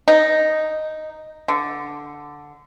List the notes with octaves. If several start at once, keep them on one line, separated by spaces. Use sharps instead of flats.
D#4
D3